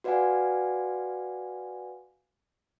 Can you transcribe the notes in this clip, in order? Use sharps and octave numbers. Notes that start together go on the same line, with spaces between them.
F#4 B4 D5 F5 F#5 G#5